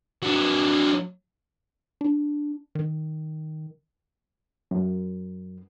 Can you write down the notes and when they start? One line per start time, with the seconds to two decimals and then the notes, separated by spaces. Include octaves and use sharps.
0.23 F#3 D4
2.01 D4
2.75 D#3
4.71 F#2